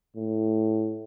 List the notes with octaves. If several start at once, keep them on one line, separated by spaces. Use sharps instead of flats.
A2